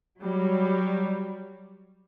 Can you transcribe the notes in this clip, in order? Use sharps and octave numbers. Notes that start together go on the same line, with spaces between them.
F#3 G3